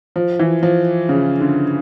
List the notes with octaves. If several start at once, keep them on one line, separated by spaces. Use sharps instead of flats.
F3
E3
F3
C#3
D3